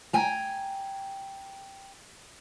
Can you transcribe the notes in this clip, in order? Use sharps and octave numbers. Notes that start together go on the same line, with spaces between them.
G5 G#5 A#5